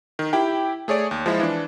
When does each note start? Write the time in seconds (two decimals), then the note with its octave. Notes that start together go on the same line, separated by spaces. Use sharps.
0.19 D#3
0.33 E4 G4 G5
0.88 A3 G#4 C#5 D5
1.11 D#2
1.26 F3 G#3 E4
1.40 E3 D4